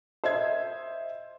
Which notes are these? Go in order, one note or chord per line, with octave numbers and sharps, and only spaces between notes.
C5 D#5 E5 G#6